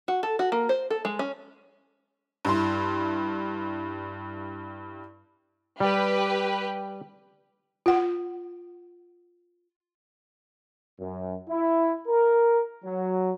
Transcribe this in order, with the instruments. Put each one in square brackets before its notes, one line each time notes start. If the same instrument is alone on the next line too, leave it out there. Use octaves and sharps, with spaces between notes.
[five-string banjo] F#4
A4
F#4
A#3
C5
A4
G#3
C#4
[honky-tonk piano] G2 E4 C6
[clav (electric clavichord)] G3 [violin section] G4 B4
[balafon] F4 F#5
[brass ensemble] F#2
E4
A#4
F#3